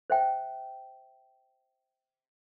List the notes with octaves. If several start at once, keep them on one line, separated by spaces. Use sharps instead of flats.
C5 E5 G5